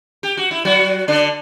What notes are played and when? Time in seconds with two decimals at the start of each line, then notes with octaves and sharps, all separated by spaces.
0.23 G4
0.37 F#4
0.51 E4
0.65 F#3 F#4
1.08 D3 D4